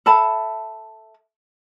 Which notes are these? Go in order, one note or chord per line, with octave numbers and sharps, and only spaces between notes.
A4 E5 A5 B5